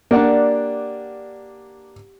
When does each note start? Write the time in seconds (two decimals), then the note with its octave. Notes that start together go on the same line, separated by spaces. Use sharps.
0.11 A#3 D4 G4 D5 F#5